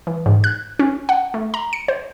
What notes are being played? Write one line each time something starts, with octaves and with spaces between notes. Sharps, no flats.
E3
G#2
F#6
C#4
F#5
A3
A#5
C#7
C5